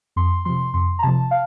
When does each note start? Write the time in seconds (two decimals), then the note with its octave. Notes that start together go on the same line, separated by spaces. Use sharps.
0.16 F2 C6
0.45 C3 F3 C6
0.74 F2 C6
0.99 A#5
1.03 C3 F3 A5
1.31 F5